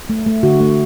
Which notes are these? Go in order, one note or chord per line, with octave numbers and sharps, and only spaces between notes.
A3
A3
D3 F#4
A3